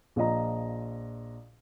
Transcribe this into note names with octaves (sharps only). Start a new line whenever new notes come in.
A#1 F4 D#5 A#5